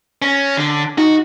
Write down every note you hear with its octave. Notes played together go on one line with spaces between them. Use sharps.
C#4 A#6
D3
D#4 F#4